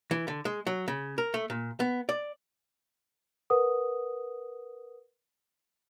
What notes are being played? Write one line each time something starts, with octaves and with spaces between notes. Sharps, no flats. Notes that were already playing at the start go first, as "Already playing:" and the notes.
E3
D3
G#3
F#3
C#3
A#4
A3
A#2
B3
D5
A#4 B4 F#5 D#6